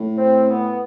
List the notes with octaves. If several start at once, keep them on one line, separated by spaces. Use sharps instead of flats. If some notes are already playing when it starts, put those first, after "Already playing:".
Already playing: A2
C4
B3